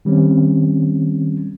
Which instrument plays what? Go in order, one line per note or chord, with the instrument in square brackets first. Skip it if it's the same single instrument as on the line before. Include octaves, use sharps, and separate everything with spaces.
[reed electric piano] D#3 G3 C4 C#4